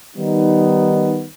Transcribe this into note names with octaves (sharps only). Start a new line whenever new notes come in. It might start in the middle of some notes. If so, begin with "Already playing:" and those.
D#3 G3 B3 D#4